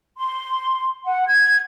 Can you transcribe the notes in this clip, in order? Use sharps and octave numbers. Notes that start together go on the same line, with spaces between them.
C6
F#5
G#6